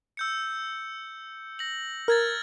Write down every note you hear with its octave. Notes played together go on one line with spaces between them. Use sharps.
E6 G6 C#7
A#6 F#7
A#4 F6 G#6 A6